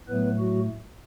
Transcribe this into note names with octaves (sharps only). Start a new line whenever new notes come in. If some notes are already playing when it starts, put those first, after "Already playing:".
A2 F#3 A3 B3 B4
F#3 F#4